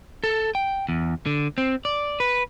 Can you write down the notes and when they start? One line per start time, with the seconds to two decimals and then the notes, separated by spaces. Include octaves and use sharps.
0.24 A4
0.55 G5
0.89 E2
1.26 D3
1.58 C4
1.85 D5
2.20 B4